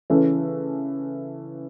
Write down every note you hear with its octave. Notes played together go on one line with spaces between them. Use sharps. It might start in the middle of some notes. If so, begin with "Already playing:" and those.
C#3 E3 C#4 A4